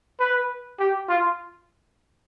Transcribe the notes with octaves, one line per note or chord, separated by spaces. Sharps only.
B4
G4
F4